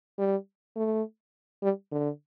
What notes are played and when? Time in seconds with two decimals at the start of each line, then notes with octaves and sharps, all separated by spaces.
0.19 G3
0.77 A3
1.63 G3
1.92 D3